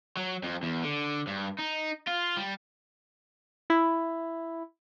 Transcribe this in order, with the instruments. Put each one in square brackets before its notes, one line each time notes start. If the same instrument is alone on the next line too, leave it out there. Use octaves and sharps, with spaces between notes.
[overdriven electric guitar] F#3
F2
E2
D3
G2
D#4
F4
G3
[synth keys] E4